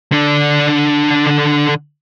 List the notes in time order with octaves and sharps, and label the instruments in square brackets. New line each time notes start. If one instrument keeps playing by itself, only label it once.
[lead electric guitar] D3 D4